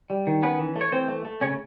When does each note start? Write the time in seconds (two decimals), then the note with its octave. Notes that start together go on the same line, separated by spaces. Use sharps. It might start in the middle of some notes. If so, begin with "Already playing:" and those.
0.10 G3
0.27 D#3
0.42 B3 C#4 B4
0.59 E3
0.76 A3
0.81 C#5
0.92 E3 C4 C5
1.08 A3
1.25 A3
1.41 C#3 C#4 C#5